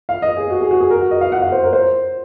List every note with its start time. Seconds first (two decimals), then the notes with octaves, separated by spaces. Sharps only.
0.09 F5
0.22 D#5
0.37 G#4
0.50 F#4
0.61 G#4
0.71 F#4
0.81 G#4
0.90 A#4
1.01 F#4
1.11 D#5
1.21 F5
1.32 F#5
1.42 F5
1.52 C5
1.64 A#4
1.73 C5